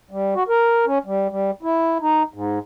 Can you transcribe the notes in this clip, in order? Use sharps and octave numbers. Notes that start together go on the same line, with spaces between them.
G3
F#4
A#4
C#4
G3
G3
E4
D#4
G#2